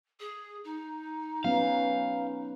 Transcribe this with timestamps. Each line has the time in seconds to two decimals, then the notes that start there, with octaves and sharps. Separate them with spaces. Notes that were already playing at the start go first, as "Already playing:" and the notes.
0.19 G#4
0.64 D#4
1.44 F#3 B3 C#4 F5